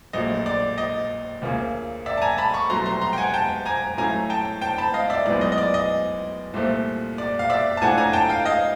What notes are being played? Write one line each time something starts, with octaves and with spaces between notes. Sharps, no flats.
A#1 A#2 F#3 A3 D#5
D5
D#5
D2 C#3 F3 A#3
D5 E5
A5
G#5 A#5
A5 B5
B5 C#6
C2 B2 F#3 A3 A#5 C6
A#5 C6
A#5 C6
G5
F#5 G#5
G5 A5
G#5 A#5
A2 F#3 A3 C#4 F4 G#5 A#5
G5 A5
G5 A5
A5 B5
D#5 F5
D5 E5
B1 A2 F3 G#3 B3 D5
D#5
D#5
D5
D#5
C2 A#2 F3 A3 C4
D5
F5
D5 E5
A5
A2 F3 A3 D4 F4 F#5 G#5
G#5 A#5
G5 A5
F5 G5
D#5 F5